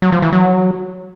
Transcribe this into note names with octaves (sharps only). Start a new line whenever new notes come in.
F#3
F3
E3
F#3